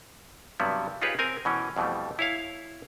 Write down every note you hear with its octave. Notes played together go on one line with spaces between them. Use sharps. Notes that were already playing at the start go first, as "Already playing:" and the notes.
G2 C3 F#3 G3 B3
D#4 F4 G4 G#4 B4 C#5
C4 A#4 G#5
B2 E3 C#4
F2 B2 E3 G3 A3
E4 C#5 F5